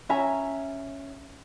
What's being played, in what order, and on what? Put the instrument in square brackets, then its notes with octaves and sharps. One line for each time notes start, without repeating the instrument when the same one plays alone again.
[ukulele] C#4 E5 G#5 A#5